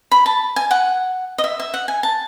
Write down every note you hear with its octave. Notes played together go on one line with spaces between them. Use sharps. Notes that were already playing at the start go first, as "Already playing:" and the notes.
B5
A5
G#5
F#5
D#5
E5
E5
F#5
G#5
A5